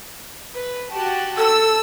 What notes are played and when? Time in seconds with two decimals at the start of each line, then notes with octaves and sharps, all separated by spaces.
0.54 B4
0.90 F#4 G4 A5
1.37 A4 E6